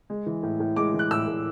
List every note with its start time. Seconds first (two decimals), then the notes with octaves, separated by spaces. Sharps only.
0.10 G#3
0.26 E3
0.43 A2
0.60 A2
0.76 G#3 D6
0.94 E3
0.99 F#6
1.11 A2 E6
1.27 A2